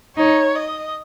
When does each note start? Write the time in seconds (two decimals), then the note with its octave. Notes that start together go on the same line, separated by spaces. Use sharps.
0.17 D#4 C#5
0.56 D#5